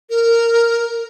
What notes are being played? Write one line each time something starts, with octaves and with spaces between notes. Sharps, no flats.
A#4